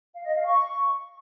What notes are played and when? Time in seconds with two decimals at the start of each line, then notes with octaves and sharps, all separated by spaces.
0.13 F5
0.24 D#5
0.35 F5
0.46 C#6